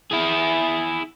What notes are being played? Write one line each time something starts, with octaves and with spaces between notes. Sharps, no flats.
E4 G#4